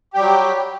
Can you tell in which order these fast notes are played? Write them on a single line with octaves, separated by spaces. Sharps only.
G4 G3 F#3